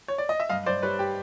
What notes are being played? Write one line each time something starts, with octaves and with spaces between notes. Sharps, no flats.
C#5
D5
D#5
E5
G2 D#5 F5
G2 C5 D5
G3 B4 C#5
G4